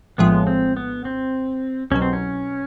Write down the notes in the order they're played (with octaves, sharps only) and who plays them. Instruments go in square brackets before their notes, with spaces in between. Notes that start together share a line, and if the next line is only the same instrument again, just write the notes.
[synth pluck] A#1 A2 F3 G#3 [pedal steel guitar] B3
[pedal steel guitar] C4
B3
C4
[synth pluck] C2 B2 F#3 [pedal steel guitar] C#4
[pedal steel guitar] C4
C#4